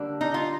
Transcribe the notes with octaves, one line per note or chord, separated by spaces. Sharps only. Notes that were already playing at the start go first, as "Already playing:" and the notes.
Already playing: D3 G3 A#3 D4
D#4
F4